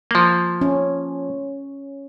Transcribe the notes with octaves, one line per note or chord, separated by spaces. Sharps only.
F3 A#3
C#4